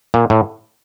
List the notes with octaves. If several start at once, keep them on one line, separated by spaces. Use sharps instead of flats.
A#2
A2